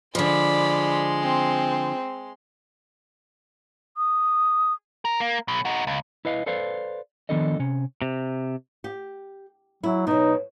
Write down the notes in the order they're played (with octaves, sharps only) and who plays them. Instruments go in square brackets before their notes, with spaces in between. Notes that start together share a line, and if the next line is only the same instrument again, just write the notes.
[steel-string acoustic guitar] D3 F3 [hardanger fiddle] G#3 C6 [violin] D5 B5
[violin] C4
[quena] D#6
[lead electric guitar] A#4
A#3
B2 F#3
D#4 F#4
C#2
[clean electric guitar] E4 B4 D#5 F5
A4 B4 C5 D5 F5
D#3 F3 B3 D4 A4 D#5
C3 C#4
C3
[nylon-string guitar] G4
[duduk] F#3 [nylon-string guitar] E4
[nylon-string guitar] B2 F#3 [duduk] D#4